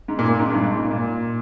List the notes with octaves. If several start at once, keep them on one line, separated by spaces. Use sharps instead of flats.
G#2
A#2
A#2
G#2
G2
G#2
A#2
A#2